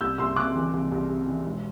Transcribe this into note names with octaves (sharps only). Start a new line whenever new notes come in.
C2 E6 G6
C2 C6 E6
C3 D6 F#6
E3
C2
C2
C3
E3
E1